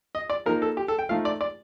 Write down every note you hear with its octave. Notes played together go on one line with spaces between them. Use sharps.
D#5
D5
F3 A#3 D#4 A#4
A4
G4
A4
G5
F3 A3 D#4 F5
D5
D5